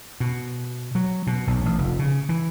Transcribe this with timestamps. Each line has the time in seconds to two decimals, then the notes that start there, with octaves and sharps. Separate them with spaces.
0.20 B2
0.95 F#3
1.27 B2
1.47 B1
1.66 A1
1.78 F1
1.99 C#3
2.29 E3